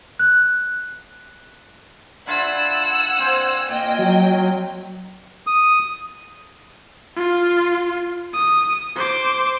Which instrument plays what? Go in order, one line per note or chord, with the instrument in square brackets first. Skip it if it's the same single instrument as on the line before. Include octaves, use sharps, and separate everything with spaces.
[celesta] F#6
[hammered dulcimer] D3 E4 F4 [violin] F#5 E6
[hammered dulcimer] C4 C5 G#5
[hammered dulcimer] A#2 [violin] D#5 G5
[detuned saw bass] F#3
[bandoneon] D#6
[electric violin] F4
D#6
C5 D6